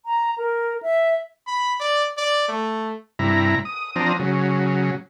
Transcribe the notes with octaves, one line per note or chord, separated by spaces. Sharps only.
A#5
A#4
E5
B5
D5
D5
A3
G2 C3 E4 A#5
D#6
F3 C4 D4 A#5 D#6
C#3 F#3